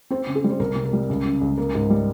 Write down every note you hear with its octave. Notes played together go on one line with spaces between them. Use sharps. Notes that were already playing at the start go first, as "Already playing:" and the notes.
C4 C5
C#3
G#4
G3
C5
C2 A#4
C3
A#4
G3
C#2
C#3
C#2
A#3 A#4
G#2
G3